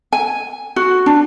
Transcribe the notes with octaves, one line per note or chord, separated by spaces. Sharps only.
G#5
F#4
D4